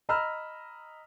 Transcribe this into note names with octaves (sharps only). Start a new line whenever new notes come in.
D#5 A#5 B5 E6 F6